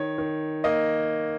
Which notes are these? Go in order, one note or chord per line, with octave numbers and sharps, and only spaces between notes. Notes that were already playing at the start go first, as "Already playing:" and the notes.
Already playing: D#3 C#5
D#3
A#3 D#5